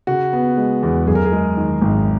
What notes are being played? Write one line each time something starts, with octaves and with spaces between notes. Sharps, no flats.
C#3 F#4
B3
G#3
E2
F#2 G#4
A#4
G#4
G#3
D#3
G#1